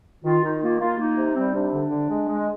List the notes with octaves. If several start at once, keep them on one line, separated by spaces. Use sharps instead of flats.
D#3 F4
D#3 D#4
A#3 F4
A#3 F4
A#3 D#4
C3
G3 C4
C3 D4
D3
D3
G#3
G#3